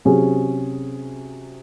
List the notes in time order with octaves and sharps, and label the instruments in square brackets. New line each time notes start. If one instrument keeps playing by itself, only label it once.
[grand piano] C3 F#3 C#4 G#4